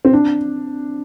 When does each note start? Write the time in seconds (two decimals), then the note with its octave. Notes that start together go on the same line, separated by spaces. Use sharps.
0.05 C4
0.13 D4